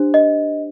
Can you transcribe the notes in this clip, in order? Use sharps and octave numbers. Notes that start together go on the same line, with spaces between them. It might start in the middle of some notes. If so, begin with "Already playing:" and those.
Already playing: D4 G4 C5
D#5